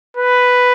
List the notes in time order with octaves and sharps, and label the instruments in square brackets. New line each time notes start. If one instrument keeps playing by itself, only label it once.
[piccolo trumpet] B4